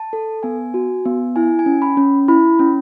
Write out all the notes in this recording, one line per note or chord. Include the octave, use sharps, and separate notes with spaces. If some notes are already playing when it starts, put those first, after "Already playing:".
Already playing: A5
A4
B3 G#5
F#4
B3
E4 G#5
G#5
C#4
B5
C#4
E4 B5
C#4